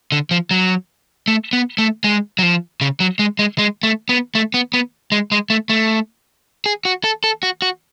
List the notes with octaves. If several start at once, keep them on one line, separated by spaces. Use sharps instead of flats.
D3
F3
F#3
A3
B3
A3
G#3
F#3
F3
C#3
F#3
G#3
G#3
G#3
A3
B3
A3
B3
B3
G#3
G#3
A3
A3
G#4
F#4
A4
A4
F#4
F#4